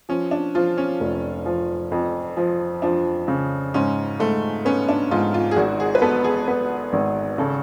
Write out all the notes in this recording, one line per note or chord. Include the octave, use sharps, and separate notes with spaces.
F3 C#4
D4
F3 F4
C#4
F1
F3
F2
F3
F3 D4
C#3
G#2 C#4
G#2 A3
B3 C#4
D4
G#2 F4
F4
G#4
G#1 F#4
G#4
B4
B3 A4
G#4
B3
G#1
C#3 A4